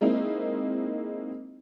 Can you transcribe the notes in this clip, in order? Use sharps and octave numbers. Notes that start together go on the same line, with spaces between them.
G#3 A#3 C4 D#4 E4